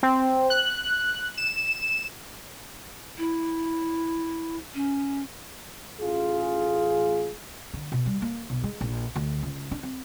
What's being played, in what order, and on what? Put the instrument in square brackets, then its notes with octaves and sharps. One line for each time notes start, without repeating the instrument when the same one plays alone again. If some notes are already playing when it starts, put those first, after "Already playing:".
[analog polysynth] C4
F#6
E7
[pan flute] E4
C#4
[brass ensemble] A1 F4 G#4
[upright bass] D3
B2
G3
A#3
B1
G#3
A#1
D2
C#2
D4
C4